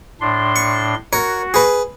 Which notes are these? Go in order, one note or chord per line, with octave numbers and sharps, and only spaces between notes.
A2 D4 C6
C#6
F#4 A#4 C#5
G#4 B4